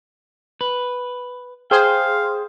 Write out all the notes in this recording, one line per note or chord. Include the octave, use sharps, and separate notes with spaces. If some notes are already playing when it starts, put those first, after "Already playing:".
B4
G#4 C5 F5 G5